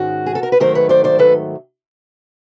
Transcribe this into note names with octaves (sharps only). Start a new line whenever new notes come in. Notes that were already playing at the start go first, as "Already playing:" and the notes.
Already playing: G#2 D#3 G#3 C#4 F#4
G#4
A4
A#4
B4
G#2 D#3 F#3 A3 A#4 C5
B4 C#5
C5 D5
C5 D5
A4 B4